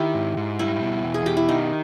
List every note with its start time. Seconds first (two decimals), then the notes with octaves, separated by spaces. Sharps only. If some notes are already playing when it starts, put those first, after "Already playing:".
Already playing: D#3 E4 G4
0.15 G#2
0.37 G#2
0.59 G3 E4
0.82 B2
1.03 E2
1.14 G#4
1.26 B2 G4
1.37 E4
1.49 D#3 D#4